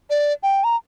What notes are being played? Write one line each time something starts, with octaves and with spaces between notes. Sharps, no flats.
D5
G5
A#5